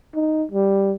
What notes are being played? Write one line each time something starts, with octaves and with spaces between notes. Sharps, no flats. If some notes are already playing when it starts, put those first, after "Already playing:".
D#4
G3